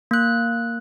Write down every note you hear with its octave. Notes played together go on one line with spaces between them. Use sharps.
A#3 F#6